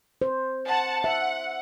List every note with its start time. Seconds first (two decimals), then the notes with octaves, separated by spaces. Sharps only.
0.22 C5
0.67 F#5 A5
1.04 E5 F#5